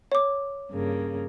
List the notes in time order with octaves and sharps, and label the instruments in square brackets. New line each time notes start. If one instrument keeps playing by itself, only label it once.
[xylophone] C#5 D6
[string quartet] G2 C#3 A#3